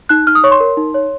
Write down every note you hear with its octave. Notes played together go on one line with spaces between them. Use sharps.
D#4 F#6
D#4 F6
D#6
C#5 C#6
C6
A#4
D#4
C#5